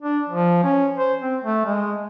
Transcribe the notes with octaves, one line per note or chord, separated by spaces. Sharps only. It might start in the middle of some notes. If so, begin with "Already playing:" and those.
D4
F3
C#4
C5
C4
A3
G#3